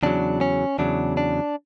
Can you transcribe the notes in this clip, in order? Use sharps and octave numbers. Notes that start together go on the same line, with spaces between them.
E2 C#3 F#3 D4
C#4
E2 C#3 F#3 D4
D4